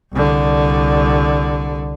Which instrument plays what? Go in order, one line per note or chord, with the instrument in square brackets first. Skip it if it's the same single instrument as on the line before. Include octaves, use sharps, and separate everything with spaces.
[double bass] C2 D3